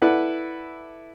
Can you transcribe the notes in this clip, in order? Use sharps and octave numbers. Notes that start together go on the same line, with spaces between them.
E4 A4 B4 D5 F#5